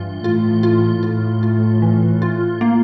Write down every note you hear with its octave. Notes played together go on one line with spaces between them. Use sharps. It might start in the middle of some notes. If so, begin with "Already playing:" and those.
Already playing: G2 E3 F4
A2 F4
F4
A2 F4
F4
E3
F4
A#3